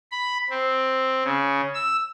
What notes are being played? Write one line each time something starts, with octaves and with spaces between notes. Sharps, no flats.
B5
C4
C#3
E6